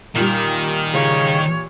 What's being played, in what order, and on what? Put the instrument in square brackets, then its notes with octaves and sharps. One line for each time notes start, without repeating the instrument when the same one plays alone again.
[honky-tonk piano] A#2 G3 [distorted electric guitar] D#3
[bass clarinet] C#3 [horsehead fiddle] C#5